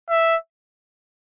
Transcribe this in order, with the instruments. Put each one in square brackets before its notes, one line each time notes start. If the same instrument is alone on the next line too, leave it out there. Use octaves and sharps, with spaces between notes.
[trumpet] E5